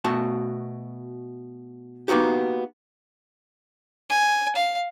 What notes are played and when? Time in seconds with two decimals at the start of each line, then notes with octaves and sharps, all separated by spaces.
0.04 B2 A3 F#4 A5
2.08 A#3 B3 D#4 F#4 G4
4.10 G#5
4.56 F5